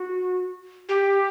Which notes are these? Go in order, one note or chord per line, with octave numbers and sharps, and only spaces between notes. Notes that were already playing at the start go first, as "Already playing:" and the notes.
Already playing: F#4
G4